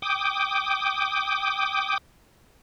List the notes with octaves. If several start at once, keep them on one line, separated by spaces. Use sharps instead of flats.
G5 D6 D#6